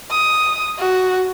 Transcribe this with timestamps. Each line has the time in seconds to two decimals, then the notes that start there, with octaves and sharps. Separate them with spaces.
0.11 D#6
0.79 F#4